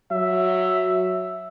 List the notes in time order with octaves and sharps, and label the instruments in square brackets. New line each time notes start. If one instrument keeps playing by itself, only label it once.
[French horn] F#3 [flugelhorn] E5